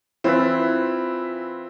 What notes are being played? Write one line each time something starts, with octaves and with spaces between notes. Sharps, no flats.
E3 C4 E4 F4 B4